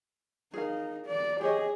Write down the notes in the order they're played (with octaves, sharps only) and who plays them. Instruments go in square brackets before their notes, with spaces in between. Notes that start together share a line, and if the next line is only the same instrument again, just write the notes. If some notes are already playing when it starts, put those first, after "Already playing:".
[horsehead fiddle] D#4 [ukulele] G#4 A#4 F5
[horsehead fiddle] D5
[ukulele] G4 C#5 D#5 [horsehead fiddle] G#4